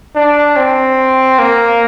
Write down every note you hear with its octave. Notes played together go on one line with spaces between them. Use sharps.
D4
C4
A#3